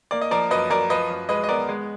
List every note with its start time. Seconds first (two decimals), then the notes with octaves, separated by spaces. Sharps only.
0.11 A#3 D5
0.21 D#5
0.31 F3 A#4 D5
0.51 F#2 B4 D#5
0.70 F#2 A#4 D5
0.90 F3 B4 D#5
1.10 F#2
1.29 G#3 B4 D#5
1.44 D#5
1.49 B3 A#4 D5
1.69 G#3